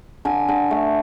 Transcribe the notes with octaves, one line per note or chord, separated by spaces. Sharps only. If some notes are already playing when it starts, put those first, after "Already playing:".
D3 G#5
D3
A3